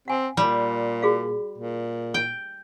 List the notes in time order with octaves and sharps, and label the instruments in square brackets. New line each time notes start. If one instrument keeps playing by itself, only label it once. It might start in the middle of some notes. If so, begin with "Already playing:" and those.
[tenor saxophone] C4 [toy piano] F#5 G#5
[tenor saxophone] A#2 [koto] G3
[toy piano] F#4 G#4 F5
[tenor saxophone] A#2
[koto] G5